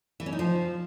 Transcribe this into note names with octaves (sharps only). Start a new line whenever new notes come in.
E3
C#4
D#4
F3